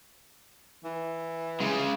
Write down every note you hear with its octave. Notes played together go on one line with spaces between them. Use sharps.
E3
C#3 G#3